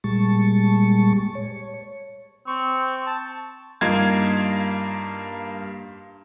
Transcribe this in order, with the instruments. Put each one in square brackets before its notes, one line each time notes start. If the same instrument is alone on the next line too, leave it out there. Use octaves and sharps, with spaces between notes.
[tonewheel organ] A#2 G3 G#3 A5 C#6
C#5
[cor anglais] C4 [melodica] C#6
[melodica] A5
[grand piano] G2 A#3 D#4 F4 G#6